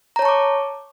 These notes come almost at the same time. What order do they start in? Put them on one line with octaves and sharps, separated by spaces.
A#5 C#5 A5 C#6 D6